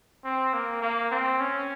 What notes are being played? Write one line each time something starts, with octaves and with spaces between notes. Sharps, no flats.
C4
A#3
A#3
C4
C#4